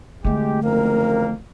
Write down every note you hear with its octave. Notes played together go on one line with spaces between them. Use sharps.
C2 D3 G#3 A3 G4
F#1 F2 A#3 A#4